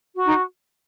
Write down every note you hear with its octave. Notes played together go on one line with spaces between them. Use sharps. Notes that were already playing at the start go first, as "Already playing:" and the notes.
F#4
D#4